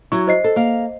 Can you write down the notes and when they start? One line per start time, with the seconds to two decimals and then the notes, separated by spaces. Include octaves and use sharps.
0.12 F#3 E4 C#6
0.28 C5 D#5 C7
0.44 A4
0.56 A#3 F5